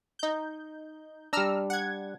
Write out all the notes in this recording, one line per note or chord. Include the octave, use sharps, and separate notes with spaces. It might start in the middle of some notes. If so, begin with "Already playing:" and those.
D#4 G6
G3 D4 A#5 E6 F6
F#5 G#6